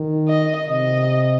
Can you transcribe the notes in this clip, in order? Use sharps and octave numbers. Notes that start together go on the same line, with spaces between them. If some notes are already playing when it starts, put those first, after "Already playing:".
Already playing: D#3
D#5
C3 D#5